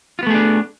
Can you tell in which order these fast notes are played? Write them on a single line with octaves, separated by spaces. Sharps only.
F4 B3 A3 G#4 D4